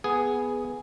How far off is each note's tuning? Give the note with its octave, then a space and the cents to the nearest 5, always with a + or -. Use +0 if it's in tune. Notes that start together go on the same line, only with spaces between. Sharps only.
B3 +0 G#4 +0